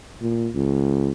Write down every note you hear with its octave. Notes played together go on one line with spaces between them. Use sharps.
A#2
C#2